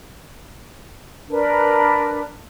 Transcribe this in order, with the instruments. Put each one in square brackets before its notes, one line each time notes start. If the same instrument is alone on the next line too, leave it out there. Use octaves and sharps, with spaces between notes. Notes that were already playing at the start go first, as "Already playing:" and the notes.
[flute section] D4 A#4 B4